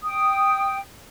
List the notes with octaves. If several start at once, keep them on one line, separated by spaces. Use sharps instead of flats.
G5 D#6